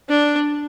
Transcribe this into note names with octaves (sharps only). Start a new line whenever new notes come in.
D4